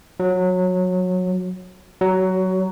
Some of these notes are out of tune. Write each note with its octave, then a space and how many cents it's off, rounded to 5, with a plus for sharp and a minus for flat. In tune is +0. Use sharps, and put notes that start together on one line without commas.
F#3 -20
F#3 +15